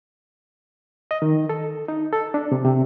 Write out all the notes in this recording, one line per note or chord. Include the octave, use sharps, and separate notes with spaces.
D#5
D#3
A4
D#4
A4
D4
C3
C3